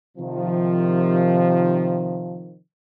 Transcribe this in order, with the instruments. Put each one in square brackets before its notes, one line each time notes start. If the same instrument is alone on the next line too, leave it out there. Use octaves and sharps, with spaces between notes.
[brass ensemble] C3 D#3 F3